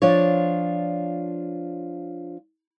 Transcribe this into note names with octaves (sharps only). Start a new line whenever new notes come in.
F3 D4 F4 C#5